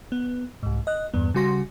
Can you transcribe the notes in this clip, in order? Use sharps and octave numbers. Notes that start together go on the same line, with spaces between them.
B3
C2 G#2
D#5 F#6
E2 G2 B3
C#3 G3 F#4 C6 A#6